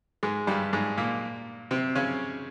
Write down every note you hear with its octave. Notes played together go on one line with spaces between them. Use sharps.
G#2 G#3
G2 G3
G#2 G#3
A#2 A#3
C3 C4
C#3 C#4